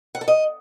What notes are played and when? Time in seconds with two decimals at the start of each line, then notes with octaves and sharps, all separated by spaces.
0.15 F#5
0.21 A4
0.28 D#5